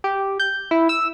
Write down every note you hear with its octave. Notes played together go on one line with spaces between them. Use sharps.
G4
G6
E4
E6